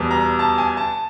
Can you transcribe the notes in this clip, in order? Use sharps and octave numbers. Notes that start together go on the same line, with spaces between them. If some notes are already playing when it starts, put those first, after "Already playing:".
Already playing: E2 B2 G3 B3
A#5
A5
G#5
A5